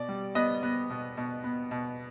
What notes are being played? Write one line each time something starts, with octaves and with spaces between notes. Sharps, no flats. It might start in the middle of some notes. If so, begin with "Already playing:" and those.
Already playing: B2 D5
G3
B3 D#5
B3
B2
B2
B3
B2